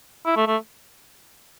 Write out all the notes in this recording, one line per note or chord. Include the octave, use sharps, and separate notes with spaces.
E4
A3
A3